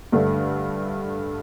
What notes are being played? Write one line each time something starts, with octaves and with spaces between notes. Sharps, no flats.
G2 D3 A3